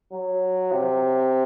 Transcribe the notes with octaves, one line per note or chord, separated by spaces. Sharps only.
F#3
C3